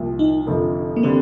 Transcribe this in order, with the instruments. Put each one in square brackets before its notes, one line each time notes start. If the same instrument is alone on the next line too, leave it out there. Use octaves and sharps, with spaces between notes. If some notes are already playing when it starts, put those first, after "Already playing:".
Already playing: [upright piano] C2 A#2 F3
[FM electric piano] D#4
[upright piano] F1 F2 D3 F3
[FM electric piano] A#3
[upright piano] D3 G3 [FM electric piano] C4